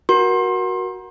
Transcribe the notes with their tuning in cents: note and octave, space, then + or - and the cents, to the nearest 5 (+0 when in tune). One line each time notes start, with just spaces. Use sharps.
F#4 +0 A#4 +25 C6 +30